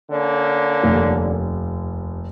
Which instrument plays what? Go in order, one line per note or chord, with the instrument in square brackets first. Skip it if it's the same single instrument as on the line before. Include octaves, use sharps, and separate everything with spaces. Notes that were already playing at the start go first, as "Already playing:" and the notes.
[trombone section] D3 A#3 C#4
[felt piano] F1 D#2